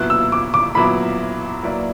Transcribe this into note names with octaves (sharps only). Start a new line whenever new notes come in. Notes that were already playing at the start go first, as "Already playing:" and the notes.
Already playing: A#2 F#3 B3 E4 F#6
E6
D6
D6
A#2 F#3 B3 E4 B5
F#3 A#3 E4 B4 D5